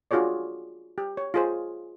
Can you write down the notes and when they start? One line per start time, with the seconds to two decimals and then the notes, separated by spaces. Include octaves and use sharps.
0.11 D4 F4 F#4 G#4 C#5 D5
0.98 G4
1.17 C#5
1.34 F4 G#4 C5